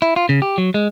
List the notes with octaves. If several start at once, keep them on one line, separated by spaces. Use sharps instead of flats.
E4
F4
C#3
G4
F#3
G#3